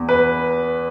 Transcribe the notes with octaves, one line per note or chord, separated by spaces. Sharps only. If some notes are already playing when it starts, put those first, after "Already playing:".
Already playing: E2
B4